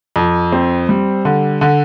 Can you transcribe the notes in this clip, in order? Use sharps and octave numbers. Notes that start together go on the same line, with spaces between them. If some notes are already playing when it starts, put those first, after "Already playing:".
F2
C4
G3
D3
D3